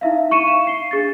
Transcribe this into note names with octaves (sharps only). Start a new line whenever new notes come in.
D#4 E4 E5 F5
C#6 C#7 D#7 E7
F5 E7
C7 G7
D4 G#4 A6